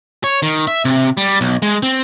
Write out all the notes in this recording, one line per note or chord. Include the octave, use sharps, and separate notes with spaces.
C#5
D#3
E5
C3
G3
B1
G#3
C4